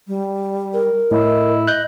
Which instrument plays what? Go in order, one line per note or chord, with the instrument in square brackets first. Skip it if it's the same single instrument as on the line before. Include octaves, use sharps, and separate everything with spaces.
[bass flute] G3
[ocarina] A#4
[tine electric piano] A2 [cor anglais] E4 [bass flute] D#5
[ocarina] D#5 [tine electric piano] F#6 G6